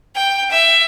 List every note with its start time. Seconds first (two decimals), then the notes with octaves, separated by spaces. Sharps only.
0.15 G5
0.50 E5